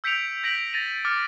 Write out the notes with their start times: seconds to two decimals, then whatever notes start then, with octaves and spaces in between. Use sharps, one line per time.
0.04 E6 G6 B6 C#7 D7 F7
0.44 G6 A#6 B6 D7 F#7
0.73 A6 A#6 D#7 F7
1.05 D6 F6 A6 C#7